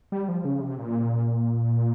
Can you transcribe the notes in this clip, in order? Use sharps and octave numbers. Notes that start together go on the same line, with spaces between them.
G3
F3
C#3
C3
A#2